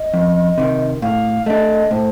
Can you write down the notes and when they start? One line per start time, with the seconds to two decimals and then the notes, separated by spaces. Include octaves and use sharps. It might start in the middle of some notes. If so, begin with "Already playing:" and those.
Already playing: D#5
0.14 F2
0.58 C3 D#3
1.02 A2 F5
1.46 A3 D4 D#5
1.91 A2 C5